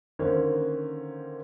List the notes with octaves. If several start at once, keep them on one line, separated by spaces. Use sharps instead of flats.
D3 D#3 A#3 C#4 C5